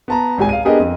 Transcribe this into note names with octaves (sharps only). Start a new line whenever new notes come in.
B3 A5 A#5
G#1 C#2 G4 G#5
F5 D#7
B3 D4 G4 G#4 A#4 D#5
F2